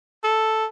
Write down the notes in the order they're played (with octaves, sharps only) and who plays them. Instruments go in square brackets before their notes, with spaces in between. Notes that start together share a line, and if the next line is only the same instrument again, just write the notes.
[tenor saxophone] A4